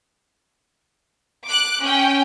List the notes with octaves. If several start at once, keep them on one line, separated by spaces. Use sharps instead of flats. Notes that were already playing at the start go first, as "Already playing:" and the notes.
D6 F#6
C#4 G5